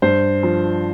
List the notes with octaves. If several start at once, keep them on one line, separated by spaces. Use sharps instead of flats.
G2 C5
F3